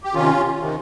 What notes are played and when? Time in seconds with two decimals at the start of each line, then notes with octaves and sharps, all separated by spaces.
0.04 G4
0.14 C3 D#3 C#4 F4
0.59 C3 D#3